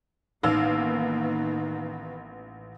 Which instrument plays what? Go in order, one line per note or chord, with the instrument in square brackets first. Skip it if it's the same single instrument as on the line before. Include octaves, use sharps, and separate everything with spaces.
[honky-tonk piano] A1 F5 E6 [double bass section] D#3 A#3 B3 [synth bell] D#4